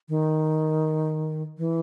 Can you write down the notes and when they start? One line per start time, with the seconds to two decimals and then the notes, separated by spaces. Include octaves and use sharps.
0.09 D#3
1.58 E3